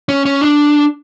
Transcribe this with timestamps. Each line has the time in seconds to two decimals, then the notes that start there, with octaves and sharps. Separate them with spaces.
0.09 C#4
0.26 C#4
0.41 D4